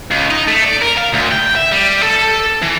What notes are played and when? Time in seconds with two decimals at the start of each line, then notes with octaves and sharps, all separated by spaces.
0.11 C#2
0.30 D#4
0.47 A3
0.64 D5
0.81 A#4
0.97 F5
1.13 D2
1.31 G5
1.56 E5
1.71 G3
2.03 A4
2.62 E3